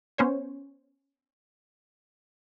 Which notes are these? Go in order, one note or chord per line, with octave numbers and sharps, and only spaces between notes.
B3 C#4 C5 C#5